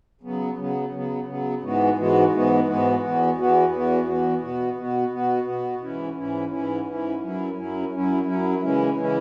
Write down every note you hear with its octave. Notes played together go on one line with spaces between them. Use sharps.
C#3 F#3 B3
C#3 F#3 B3
C#3 F#3 B3
C#3 F#3 B3
G#2 E3 G#3 B3 F#4
G#2 E3 G#3 B3 F#4
G#2 E3 G#3 B3 F#4
G#2 E3 G#3 B3 F#4
E2 E3 B3 F#4
E2 E3 B3 F#4
E2 E3 B3 F#4
E2 E3 B3 F#4
B2 B3 F#4
B2 B3 F#4
B2 B3 F#4
B2 B3 F#4
G#2 E3 C#4 E4
G#2 E3 C#4 E4
G#2 E3 C#4 E4
G#2 E3 C#4 E4
F#2 F#3 C#4 E4
F#2 F#3 C#4 E4
F#2 F#3 C#4 E4
F#2 F#3 C#4 E4
C#3 E3 G#3 C#4 E4
C#3 E3 G#3 C#4 E4